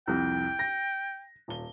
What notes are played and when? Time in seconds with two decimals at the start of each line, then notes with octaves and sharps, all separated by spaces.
0.08 C2 F2 G5
0.59 A#6
1.48 D#1 G7